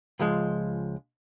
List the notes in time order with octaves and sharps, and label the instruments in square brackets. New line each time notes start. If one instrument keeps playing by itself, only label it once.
[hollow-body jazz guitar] C#2 F3 G#3